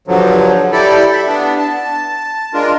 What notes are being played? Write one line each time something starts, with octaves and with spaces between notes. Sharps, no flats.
G2 D3 F3 F#3
E4 G4 A4 D5
E5 B5
B3 D4
A5
G#3 D4 F4 A#4